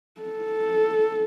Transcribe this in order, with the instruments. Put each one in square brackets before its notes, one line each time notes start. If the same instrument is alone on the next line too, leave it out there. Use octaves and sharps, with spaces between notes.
[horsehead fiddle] A4